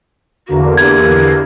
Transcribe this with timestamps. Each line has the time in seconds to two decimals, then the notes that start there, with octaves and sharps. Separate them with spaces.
0.48 E2 D3 A#3 F#4
0.77 G4 G#6